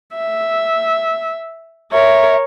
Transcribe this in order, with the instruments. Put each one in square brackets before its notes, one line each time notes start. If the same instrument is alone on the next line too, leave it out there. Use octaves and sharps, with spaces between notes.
[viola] E5
[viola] A#4 C#5 [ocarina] E5